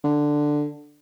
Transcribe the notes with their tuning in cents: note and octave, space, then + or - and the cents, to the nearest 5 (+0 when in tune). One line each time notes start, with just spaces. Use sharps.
D3 +5